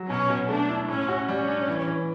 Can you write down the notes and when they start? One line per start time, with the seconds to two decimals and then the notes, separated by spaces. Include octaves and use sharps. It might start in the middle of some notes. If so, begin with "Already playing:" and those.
Already playing: F#3
0.09 B2 C#4
0.30 B2
0.49 A3 D4
0.69 E4
0.88 A2 C#4
1.08 F#4
1.28 G3 C#4
1.48 D4
1.68 E3
1.87 E3